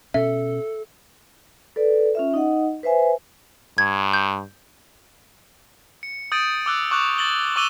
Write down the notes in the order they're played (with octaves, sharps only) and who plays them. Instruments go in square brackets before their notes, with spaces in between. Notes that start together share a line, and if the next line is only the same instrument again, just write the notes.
[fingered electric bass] B2 C#4 [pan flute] A4 [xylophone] E5
[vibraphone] A4 B4 D5
C#4 F4 E5
D#4 D#5 F#5
B4 C5 E5 G#5
[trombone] G2 [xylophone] G#6
[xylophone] G6
[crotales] C#7
D#6 G6 A6 D7 D#7
D6 E6 F#6
C#6 D6 F#6 F7
A6 F#7 G7
C#6 D6 E6 D#7 F#7 G7